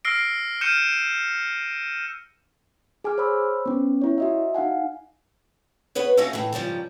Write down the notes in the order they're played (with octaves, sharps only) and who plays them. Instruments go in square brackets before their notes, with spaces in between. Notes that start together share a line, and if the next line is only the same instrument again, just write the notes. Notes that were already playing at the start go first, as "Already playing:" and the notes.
[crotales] E6 F6 A#6 C7 D7
F6 G6 C#7 D#7 E7
[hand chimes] G#4 G#5 D6 F6
C5 C#5 B5 E6
B3 C#4
E4 C#5
F#4 D#5 E5
D#4 F5 F#5 G#5
[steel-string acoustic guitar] B3 G#4 B4 C#5
A3 C#4 F#4 D#5 F5 F#5
A2 E3
G#2 C#3 F3 G3